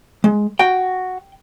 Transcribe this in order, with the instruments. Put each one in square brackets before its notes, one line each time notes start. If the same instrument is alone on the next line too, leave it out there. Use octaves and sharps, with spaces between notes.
[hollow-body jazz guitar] G#3
[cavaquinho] F#4 [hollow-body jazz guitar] G5